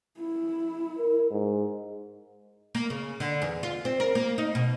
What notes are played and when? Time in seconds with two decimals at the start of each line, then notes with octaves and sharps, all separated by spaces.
0.19 E4
0.98 A#4
1.31 G#2
2.75 A#3
2.90 C#3
3.20 D3
3.42 E2
3.63 F4
3.85 C4
4.00 A#4
4.15 A#3
4.38 D#4
4.55 B2